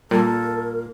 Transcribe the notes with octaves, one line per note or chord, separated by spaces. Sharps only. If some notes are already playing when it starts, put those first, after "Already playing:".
A#2 G3 A#3 A4 A#4